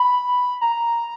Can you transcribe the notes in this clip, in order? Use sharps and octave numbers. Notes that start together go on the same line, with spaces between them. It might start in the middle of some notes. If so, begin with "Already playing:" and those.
Already playing: B5
A#5